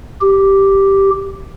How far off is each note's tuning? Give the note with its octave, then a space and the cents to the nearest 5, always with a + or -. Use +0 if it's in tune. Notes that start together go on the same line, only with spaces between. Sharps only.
G4 -5